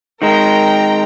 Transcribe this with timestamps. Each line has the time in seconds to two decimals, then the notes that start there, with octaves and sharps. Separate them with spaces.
0.22 D#3 G#3 A#4 G5 A#5